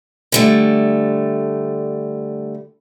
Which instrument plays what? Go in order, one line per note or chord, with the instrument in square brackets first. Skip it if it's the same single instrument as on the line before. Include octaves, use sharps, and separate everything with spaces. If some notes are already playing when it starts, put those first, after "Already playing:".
[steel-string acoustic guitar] D3 G3 A3